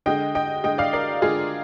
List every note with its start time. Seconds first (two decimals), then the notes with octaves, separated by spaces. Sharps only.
0.06 D3 G#3 D#5 G5
0.35 D#5 G5
0.64 D3 G#3 D#5 G5
0.78 D5 F5
0.93 A#4 D5
1.22 D3 G#3 F4 G#4